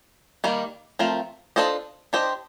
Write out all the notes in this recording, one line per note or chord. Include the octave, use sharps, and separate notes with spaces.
D#3 G3 A#3
F3 A3 C4 F4 A#4
D4 F4 A4 C5 D#5
D4 G4 C5 D#5